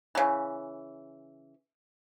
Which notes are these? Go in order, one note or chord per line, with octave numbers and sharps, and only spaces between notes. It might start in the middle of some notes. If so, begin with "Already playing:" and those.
C#3 E3